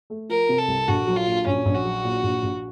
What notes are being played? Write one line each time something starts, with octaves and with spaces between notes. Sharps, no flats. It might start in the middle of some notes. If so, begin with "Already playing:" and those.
A3
F3 A#4
C3
A4
C2
A#1 F#4
F#3
F4
A#2
A#1 C#4
A#1
F#4
F#3
A#2
A#1
A#1